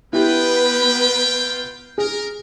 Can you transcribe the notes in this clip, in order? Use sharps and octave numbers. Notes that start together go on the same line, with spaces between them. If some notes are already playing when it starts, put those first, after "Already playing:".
B3 E4 F4 G4 B4 G5
G#4 A#4